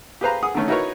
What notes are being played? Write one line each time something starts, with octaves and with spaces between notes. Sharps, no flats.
G4 G#4 B4 C5 F5 A#5
G#4 F#5 D#6
D3 D#3 A3 C#4
D#4 E4 F#4 A#4 B4 C#5